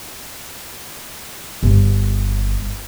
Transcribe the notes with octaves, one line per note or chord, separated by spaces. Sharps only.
G1